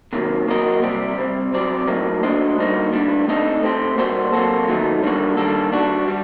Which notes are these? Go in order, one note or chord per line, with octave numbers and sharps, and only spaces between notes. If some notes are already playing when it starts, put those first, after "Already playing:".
C3 D#3 F#3 A#3
F#3 A#3 F#4 A#4 D#5
C3 G3 C4 G4
C3 G3 C4
F#3 C4 G4 D5
A2 F#3 A#3 D#4
A3 D4 F#4 C5 D#5
D3 G3 A#3 D#4 F#4
A2 G3 D4
A3 C4 D#4 A4 D#5
A3 C4 G4 C5
A#2 G3 A#3 F#4 C5
C3 F#3 A#3 F#4 A4
D#3 F#3 A3 D#4
D3 G3 A#3 F#4
D#3 G3 A#3 D4 A4
G3 D4 F#4
G3